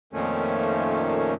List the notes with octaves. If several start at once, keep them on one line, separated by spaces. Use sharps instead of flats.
F2 A#2 D#3 F3 A3 C#4